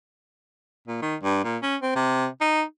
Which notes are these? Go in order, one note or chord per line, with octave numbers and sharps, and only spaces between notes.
A#2
D#3
G2
A#2
C#4
C4
C3
D#4